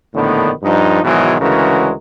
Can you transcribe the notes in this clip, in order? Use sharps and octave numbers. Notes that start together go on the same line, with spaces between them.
A#1 A2 D3 D#3 B3
G2 F3 D#4
G#2 B2 D#3 E3 F#3 G#3
D2 C#3 E3 G#3 F#4 A#4